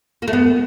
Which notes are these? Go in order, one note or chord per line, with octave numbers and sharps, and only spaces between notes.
A#3
A3
B3